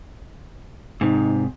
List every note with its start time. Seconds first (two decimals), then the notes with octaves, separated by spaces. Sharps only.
1.01 G#2 C3 D#4